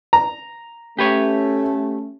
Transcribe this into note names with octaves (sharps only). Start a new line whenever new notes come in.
A#5
A3 C#4 G4 B4 C#5